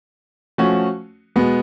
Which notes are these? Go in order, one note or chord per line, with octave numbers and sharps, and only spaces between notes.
F3 A3 C#4 F#4
B2 G#3 B3